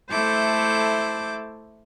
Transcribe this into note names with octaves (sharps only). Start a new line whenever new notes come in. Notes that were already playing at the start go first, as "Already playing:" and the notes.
A3 E4 A4 C5 D6 G6